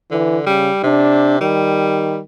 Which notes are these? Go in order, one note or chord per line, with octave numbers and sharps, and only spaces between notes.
D3 E3
C#3 G3
C3 D4
D#3 G3